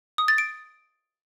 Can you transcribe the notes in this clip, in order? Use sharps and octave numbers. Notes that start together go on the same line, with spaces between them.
D#6
A6
D7